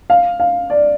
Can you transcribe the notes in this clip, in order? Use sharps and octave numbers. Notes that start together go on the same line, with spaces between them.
F5
F5
D5